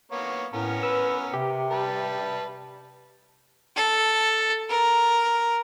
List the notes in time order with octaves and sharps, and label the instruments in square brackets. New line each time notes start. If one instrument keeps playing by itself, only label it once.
[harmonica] A#3 B3 C#5
[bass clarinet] A2 [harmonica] B3 C#4 A#4
[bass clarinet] B4 [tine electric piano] E6
[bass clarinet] C3 [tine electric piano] G4
[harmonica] G3 B4 A5
[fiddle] A4
A#4